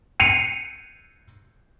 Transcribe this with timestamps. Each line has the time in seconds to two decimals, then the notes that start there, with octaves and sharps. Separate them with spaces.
0.20 C7 C#7 D#7 F7